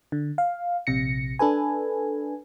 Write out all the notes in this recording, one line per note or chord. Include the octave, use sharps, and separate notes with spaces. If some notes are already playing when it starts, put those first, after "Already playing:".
D3
F5
A#1 C3 A#6 C#7
D4 A4 B4 G#5